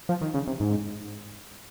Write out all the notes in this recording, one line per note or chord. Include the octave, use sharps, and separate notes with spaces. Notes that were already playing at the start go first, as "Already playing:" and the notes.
F3
D#3
C#3
C3
G#2